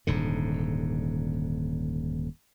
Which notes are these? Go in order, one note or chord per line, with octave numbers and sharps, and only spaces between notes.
D#1 G#2 D3